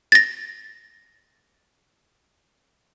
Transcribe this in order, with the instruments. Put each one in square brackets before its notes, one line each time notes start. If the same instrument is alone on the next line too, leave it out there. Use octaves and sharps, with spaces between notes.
[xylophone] A6 A#6